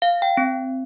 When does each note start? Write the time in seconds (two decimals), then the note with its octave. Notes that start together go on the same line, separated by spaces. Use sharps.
0.02 F5
0.22 G5
0.37 C4